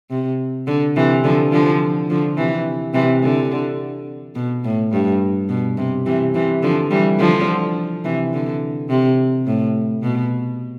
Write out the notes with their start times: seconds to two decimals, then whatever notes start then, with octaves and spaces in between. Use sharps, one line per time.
0.10 C3
0.67 D3
0.96 C3 E3
1.24 D3 F3
1.52 D3 F3
2.10 D3 F3
2.37 C3 E3
2.94 C3 E3
3.22 D3
4.35 B2
4.64 A2
4.92 G2
5.49 B2
5.77 C3
6.06 C3 E3
6.34 C3 E3
6.63 D3 F3
6.91 E3 G3
7.19 D3 F3
8.05 C3 E3
8.33 D3
8.90 C3
9.46 A2
10.03 B2